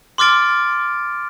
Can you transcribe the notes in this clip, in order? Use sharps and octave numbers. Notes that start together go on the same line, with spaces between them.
C6 D6 F6 A6 D7